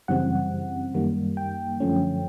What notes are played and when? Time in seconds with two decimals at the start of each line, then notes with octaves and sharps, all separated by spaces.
0.08 F#2 C#3 E3 G3 C4 F#5
0.94 F#2 D#3 G3 A#3
1.37 G5
1.80 F#2 D3 F3 A3 C#4